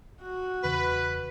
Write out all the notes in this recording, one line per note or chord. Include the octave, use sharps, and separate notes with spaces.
F#4
E2 C#3 B4